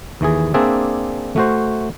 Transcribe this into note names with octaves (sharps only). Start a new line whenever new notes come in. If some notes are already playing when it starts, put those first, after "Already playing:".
D#2 E3 G#4
A#3 C4 D4 G#4 D5 E5
A3 F#4 C5